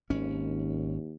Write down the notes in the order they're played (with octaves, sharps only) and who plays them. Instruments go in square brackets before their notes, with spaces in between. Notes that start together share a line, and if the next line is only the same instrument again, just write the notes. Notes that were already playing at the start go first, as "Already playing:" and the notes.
[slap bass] G#1 C#4 [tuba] D#2